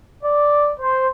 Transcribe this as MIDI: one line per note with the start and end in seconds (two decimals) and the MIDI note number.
0.24 0.70 74
0.80 1.08 72